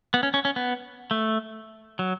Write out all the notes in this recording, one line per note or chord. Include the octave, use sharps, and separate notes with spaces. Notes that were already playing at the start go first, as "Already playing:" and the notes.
B3
C#4
C#4
C#4
B3
A3
F#3